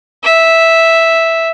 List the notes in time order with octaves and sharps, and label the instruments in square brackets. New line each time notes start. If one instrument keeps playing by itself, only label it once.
[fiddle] E5